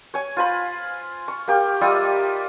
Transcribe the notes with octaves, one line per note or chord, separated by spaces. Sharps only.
C#5 G#5
F4 C5 B5
C#6
A#3 G4
G3 F4 D#5 E5